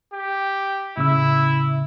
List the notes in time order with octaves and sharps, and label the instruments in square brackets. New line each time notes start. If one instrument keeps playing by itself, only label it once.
[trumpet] G4
[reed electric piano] A2 C#3 E6 [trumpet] E4